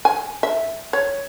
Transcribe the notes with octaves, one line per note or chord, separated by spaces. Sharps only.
G#5
E5
C#5